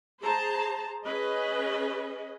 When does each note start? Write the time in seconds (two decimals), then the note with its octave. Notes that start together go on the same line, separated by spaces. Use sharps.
0.22 G#4 C5 A5 A#5
1.07 C#4 G#4 B4 D#5